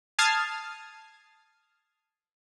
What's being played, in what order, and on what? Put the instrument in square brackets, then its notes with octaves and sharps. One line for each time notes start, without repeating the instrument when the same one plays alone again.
[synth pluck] A5 D#6 F6 G#6 A6 C7